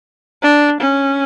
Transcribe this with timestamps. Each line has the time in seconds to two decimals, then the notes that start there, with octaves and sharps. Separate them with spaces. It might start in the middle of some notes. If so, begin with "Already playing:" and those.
0.43 D4
0.80 C#4